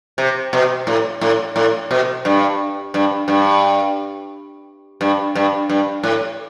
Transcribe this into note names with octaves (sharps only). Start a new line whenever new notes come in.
C3
B2
A2
A2
A2
B2
G2
G2
G2
G2
G2
G2
A2